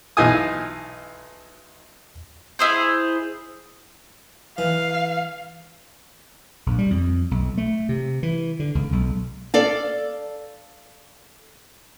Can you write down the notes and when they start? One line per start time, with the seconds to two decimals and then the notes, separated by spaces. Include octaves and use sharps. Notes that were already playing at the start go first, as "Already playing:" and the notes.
0.17 B1 E3 D#4 F4 G#5 D#6
2.59 E4 G#4 C5
4.58 E3 F5
6.66 A#1
6.79 G3
6.91 F2
7.31 B1
7.58 A3
7.89 C3
8.23 E3
8.60 D3
8.75 C#2
8.92 B1
9.54 A4 D5 F5